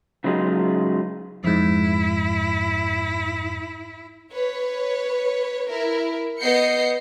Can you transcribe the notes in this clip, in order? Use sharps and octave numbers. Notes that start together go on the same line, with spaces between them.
C#3 F#3 G#3 D#4 F4
F2 G#2 E4
B4 C#5
E4 A#4
B3 D#5 G6 C7 C#7